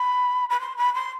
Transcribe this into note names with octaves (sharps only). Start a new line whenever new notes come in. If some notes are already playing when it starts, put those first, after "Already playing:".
Already playing: B5
B5
C6
B5
C6